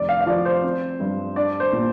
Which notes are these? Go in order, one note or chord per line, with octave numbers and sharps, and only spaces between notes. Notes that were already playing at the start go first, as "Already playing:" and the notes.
Already playing: F1 D5
F5
F5
F3 D5
C5
C4
G2
D4 D5
C5
A#2